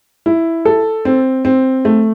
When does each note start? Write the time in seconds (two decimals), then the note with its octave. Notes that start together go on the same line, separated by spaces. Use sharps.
0.26 E4
0.65 A4
1.05 C4
1.45 C4
1.85 A3